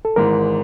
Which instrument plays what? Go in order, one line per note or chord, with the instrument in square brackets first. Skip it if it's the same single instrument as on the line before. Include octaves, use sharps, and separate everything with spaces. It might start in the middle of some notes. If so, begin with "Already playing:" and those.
[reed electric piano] A4
[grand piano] G#1 G#2 E3 [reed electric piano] A#4